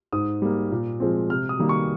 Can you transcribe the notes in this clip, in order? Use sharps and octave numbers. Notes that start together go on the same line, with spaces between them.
G#2 D#6
G3 A#3
A#2
F3 G#3 C4
C3 F6
D#6
D#3 G3 A#3
C#6